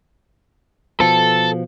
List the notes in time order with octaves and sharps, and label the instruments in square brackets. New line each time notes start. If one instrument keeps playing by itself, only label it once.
[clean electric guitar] B2 F3 [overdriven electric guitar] A4